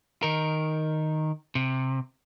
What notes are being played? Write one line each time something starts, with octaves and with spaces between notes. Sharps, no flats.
D#3 A#4
C3